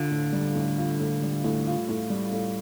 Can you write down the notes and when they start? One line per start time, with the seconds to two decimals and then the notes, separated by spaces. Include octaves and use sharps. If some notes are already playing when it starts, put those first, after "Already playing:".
Already playing: D3 F4
0.11 A2
0.33 G3
0.55 A2
0.77 F4
1.00 A2
1.22 G3
1.44 A2
1.67 F4
1.89 A2
2.10 G3
2.32 A2